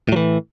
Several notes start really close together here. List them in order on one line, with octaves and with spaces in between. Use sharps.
A2 F#3 E3